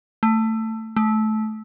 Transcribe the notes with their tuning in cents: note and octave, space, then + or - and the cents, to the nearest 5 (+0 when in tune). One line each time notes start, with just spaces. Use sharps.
A3 +15
A3 -20